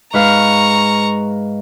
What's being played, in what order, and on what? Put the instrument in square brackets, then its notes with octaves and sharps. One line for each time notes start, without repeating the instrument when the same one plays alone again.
[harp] G#2 B4 F5 [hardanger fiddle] A#5 C#6